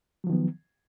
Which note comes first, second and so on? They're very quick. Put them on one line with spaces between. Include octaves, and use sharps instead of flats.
F#3 F3 D#3 B3